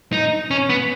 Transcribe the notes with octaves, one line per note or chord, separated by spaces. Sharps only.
D#4
C#4
B3